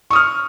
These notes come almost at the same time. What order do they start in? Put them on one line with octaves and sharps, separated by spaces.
C#6 D#6 F6